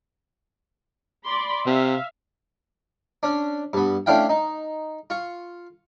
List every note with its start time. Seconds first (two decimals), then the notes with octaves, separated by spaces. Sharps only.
1.27 D5 B5 C6
1.67 C3 E5 F5
3.23 C#4 D4
3.73 G2 B3
4.06 A3 C#4 D4 E4 F5 G5
4.29 D#4
5.10 F4 C#6